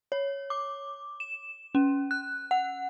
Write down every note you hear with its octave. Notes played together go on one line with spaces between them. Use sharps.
C#5
D6
E7
C#4
F#6
F#5